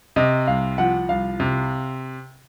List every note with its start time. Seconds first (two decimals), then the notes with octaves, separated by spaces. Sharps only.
0.16 C3 D#5
0.47 C2 F5
0.78 F3 F#5
1.09 C2 F5
1.40 C3